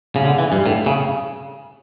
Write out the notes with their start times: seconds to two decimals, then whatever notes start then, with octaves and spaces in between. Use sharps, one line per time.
0.16 C#3
0.25 D3
0.38 E3
0.52 G2
0.66 A2
0.86 C#3